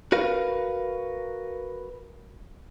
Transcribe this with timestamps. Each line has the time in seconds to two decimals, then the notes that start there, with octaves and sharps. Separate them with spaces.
0.12 F#4 A#4 B4 F5